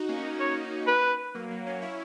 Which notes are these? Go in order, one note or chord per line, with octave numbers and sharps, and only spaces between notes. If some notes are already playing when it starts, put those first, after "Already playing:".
Already playing: D#4 F#4
A#3 C#4
C#5
B4
F#3 A#3
F#3 A#3
A#3 C#4
C#4 E4